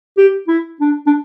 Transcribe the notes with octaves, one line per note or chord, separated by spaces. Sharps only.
G4
E4
D4
D4